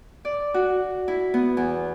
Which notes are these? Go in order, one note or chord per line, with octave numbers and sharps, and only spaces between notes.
D5
F#4
E4
B3
E2